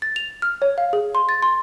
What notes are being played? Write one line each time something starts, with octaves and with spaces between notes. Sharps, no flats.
A6
F7
F6
C#5
F5
G#4
C6
A6
C6